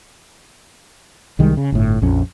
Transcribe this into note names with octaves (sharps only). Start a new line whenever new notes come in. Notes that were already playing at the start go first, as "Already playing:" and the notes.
C2 D#3 G3 G#3
C#3
G1 A2
A#1 F2 C#4